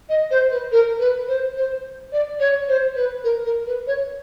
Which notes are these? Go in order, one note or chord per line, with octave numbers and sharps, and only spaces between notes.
D#5
C5
B4
A#4
B4
C5
C5
D5
C#5
C5
B4
A#4
A#4
B4
C#5